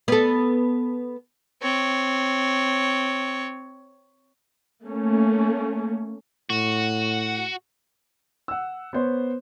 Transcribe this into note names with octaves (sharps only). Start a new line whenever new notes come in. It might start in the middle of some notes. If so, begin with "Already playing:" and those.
B3 A4
C4 C#5
A3 A#3 C#4
A2 F#4
F#5 E6
B3 C5 C#5